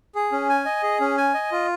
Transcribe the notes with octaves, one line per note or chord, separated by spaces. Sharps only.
G#4
C#4
G#5
D#5
G#4
C#4
G#5
D#5
F4